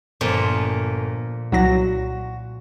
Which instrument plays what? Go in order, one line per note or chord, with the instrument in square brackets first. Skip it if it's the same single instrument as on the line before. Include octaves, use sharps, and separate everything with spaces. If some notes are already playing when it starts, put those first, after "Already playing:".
[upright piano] G1 [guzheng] A#2 F3 [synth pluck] C6
[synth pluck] C2 F#3 A#6 [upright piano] F#4